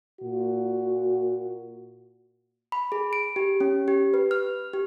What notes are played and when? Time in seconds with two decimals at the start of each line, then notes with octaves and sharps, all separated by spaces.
0.21 A#2 F#4
2.72 B5
2.92 G#4
3.13 D7
3.36 G4
3.60 C#4
3.88 G4
4.14 B4
4.31 F6
4.73 G4